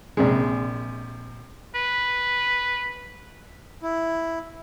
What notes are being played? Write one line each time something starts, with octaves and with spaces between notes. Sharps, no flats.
A#1 C3 G#3
B4
E4